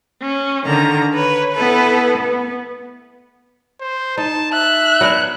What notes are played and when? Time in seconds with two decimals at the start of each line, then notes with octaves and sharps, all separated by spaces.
0.21 C#4
0.66 D3 D#3 A#5
1.14 B4 C#5
1.52 B3 E4 A4 B4
2.17 B3
3.80 C5
4.18 D#4 A5
4.53 E5 F#6
5.01 F#3 B3 D4